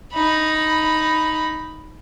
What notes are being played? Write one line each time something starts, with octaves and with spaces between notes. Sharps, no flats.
D#4 B5